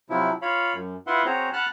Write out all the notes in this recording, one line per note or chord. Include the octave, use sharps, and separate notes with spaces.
C3 F3 F#3 E4
F4 C#5 F5 B5
F#2
E4 F4 B4 E5 F#5 C6
C4 F#4 G#4 C5 C#5 A#5
F#5 A5 B5 F6 F#6